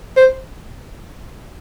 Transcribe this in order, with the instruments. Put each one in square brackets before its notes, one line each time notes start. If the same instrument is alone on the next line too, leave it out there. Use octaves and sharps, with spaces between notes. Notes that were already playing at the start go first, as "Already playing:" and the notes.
[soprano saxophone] C5